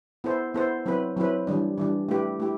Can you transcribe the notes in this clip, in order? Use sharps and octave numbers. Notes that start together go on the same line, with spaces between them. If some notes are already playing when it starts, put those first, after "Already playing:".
B3 E4 A4 C5
B3 E4 A4 C5
F#3 C4 E4 B4
F#3 C4 E4 B4
E3 G3 D4
E3 G3 D4
A3 E4 G4 B4
A3 E4 G4